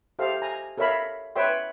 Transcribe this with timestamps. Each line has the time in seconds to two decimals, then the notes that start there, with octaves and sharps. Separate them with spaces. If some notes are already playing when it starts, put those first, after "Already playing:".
0.19 G4 A4 C5 E5 F5
0.42 G#5 A#5
0.78 A4 A#4 C#5 E5 F5 B5
1.36 B4 C#5 E5 G5 C6